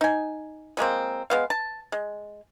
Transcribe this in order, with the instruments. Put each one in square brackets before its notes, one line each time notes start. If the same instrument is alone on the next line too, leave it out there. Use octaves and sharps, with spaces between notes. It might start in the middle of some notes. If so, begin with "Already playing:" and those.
[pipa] D#4 G#5
F3 G#3 A#3 C4
G#3 B3 F5
A5
G#3